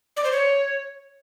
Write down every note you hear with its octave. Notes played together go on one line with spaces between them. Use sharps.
D5
C5
C#5